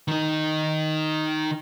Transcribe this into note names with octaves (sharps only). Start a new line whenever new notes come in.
D#3 D#4